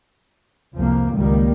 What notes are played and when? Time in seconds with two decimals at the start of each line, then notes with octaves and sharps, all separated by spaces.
0.76 C2 F2 F3 A#3
1.13 C#2 D#3 G3 A#3